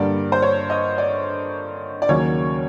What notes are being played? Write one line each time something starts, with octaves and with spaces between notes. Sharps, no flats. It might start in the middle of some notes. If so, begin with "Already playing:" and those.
Already playing: G2 D3 G3 A#3 D5
C5
C#5
D#5
D5
D5
D#2 C#3 F#3 A#3 C#4 C#5